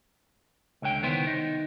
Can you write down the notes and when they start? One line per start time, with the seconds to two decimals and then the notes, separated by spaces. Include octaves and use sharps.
0.82 C#2 D3 C#5 G5
1.02 C2 D#3 B3 E4 C5
1.27 D#4